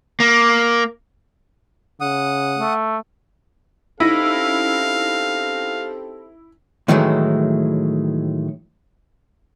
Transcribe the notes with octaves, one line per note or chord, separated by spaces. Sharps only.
A#3
C#3 F#5 D#6
A3
C4 C#4 D#4 E4 G4 A4 F5 A#6
A2 D#3 E3 F#3 G#3 A3